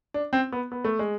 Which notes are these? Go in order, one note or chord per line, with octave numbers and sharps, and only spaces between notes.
D4
C4
B3
B3
A3
G#3